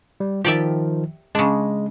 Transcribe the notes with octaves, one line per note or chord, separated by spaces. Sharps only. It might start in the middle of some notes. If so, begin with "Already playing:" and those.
G3
D#3 F3 G4 D5 E5
C#3 G#3 D4